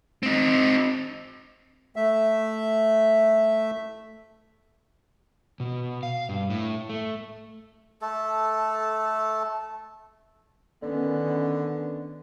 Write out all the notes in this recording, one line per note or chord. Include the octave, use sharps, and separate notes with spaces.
C4 D#4
A3 E5
B2
F5
G2
A2
A3
A3 A4
D3 D#3 B3 C#4